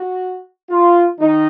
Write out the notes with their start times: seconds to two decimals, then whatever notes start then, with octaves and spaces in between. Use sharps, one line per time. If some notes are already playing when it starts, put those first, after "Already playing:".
Already playing: F#4
0.70 F4
1.19 D#3 D#4